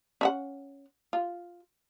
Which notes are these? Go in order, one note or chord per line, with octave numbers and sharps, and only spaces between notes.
C#4 E5 F#5
F4